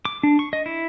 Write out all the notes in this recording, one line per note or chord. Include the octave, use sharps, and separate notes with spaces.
D6
D4
C#6
D#5
E4